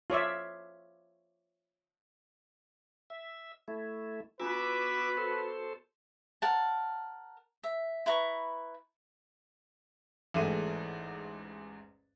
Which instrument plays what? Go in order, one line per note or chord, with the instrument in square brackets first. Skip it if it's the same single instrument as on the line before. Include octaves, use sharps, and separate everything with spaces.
[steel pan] F4 C#5 D5 E5
[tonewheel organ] E5
A3 E4
[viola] B3 F#4 [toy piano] D4 F4 [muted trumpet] B4 [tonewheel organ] D6 E6
[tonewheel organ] A4 C5 [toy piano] A#4
[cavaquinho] A#4 F#5 A5
E5
E4 B4 A#5 C#6
[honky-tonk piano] A1 E2 G#2 A3 G#4 D#7